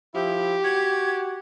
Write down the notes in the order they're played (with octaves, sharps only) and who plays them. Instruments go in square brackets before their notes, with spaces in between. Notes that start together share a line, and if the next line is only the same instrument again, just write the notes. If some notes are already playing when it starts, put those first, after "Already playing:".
[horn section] F3 E4 [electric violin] G4
[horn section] F#4 [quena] G#6